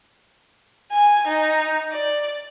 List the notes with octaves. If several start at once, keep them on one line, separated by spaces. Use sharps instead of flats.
G#5
D#4
D5